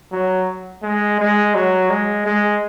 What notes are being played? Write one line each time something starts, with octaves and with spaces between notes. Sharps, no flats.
F#3
G#3
G#3
F#3
G#3
G#3